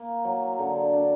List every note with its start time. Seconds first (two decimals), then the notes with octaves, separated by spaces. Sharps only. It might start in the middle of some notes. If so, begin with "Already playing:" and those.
Already playing: A#3
0.24 F#3
0.59 D3
0.93 D4